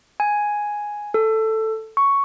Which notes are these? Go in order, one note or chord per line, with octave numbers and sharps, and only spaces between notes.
G#5
A4
C#6